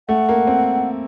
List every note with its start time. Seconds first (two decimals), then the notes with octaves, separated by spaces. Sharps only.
0.09 A3 F#5
0.29 A#3
0.47 C4